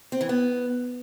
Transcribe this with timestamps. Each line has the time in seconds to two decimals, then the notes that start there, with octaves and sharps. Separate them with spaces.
0.12 C4
0.21 E3
0.29 B3